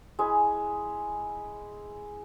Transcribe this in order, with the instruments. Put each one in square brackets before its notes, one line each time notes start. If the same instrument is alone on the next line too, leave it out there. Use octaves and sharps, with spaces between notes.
[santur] G#3 E4